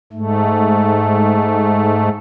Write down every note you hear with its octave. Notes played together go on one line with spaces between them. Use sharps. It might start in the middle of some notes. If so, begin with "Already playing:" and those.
G#2 A3